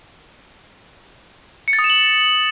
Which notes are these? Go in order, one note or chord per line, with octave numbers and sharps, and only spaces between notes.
C#7
A6
D#6
E7
F#7